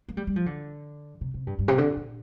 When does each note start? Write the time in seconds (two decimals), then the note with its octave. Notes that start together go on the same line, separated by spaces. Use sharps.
0.08 A#3
0.17 G3
0.27 G3
0.36 F3
0.46 D3
1.21 C3
1.34 C3
1.47 G2
1.59 G2
1.68 C3
1.78 D3
1.97 A#2